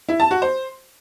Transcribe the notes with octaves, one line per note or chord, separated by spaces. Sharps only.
E4
A5
F#4
C5